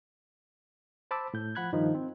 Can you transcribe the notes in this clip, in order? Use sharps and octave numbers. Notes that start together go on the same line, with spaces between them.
C5 A5 B5 D6 E6
A2 G6
F3 F#5 B5 F#6 G#6
G2 D#3 F3 D#4
C4